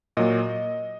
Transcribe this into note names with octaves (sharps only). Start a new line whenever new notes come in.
A#2 F#3 A#3 D#5